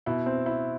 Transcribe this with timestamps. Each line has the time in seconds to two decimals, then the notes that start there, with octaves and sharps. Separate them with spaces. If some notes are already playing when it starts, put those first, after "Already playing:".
0.06 B2 E4
0.26 C4
0.46 E4